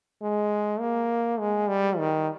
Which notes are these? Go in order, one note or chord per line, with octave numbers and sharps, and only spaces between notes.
G#3
A#3
G#3
G3
D#3